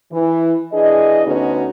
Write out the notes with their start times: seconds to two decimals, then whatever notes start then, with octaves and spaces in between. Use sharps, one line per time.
0.12 E3
0.73 E3 D4 G#4 D#5
1.26 D2 D3 B3 C#4 D#4 F#4